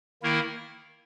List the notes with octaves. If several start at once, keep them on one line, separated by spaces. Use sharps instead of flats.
D#3 A#3 E4 A#4